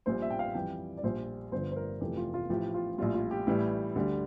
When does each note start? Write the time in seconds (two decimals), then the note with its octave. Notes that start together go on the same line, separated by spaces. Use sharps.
0.06 A#1 A#2 G3 C5
0.22 E5
0.30 G5
0.39 F5
0.55 F2 E3 G3 G5
0.98 D5
1.03 A#1 A#2 G3 C5
1.52 G1 G2 D3 F3 C5
1.72 C5
1.76 A#4
2.01 F1 F2 E3 A3 G4
2.17 F4
2.34 F4
2.49 A1 A2 F3 G4
2.74 F4
2.98 A#1 A2 G3 F4
3.14 F4
3.31 G4
3.47 A1 A2 E3 G3 E4
3.95 D2 D3 G3